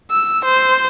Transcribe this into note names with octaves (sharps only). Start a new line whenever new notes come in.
E6
C5